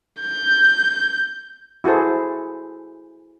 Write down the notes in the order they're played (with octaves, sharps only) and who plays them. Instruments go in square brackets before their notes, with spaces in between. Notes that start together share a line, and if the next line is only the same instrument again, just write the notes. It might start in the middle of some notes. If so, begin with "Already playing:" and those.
[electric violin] G6
[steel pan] E4 F#4 G#4 A4 C5